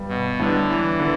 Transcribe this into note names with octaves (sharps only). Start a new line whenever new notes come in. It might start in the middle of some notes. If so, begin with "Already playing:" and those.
Already playing: G2 G3 B3
B2
A2 D3 G3 B3 D4
E3
D3 B3